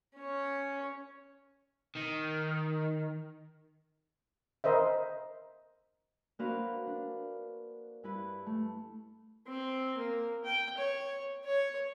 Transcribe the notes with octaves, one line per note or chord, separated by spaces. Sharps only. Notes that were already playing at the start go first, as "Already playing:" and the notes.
C#4 C#5
D#3
A#4 C5 D#5 E5
A#3 D4 F#4 B4 C5 F5
D4
G2 E4 B4
A3
C4
A#3
G5
C#5
C#5